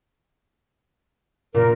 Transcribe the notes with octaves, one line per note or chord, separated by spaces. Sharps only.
A#2 A#4